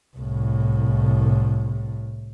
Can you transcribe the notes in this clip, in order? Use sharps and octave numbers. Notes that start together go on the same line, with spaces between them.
C2 A2